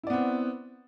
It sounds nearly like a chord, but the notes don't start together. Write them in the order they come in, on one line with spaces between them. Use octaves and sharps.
E4 D5 B3 C4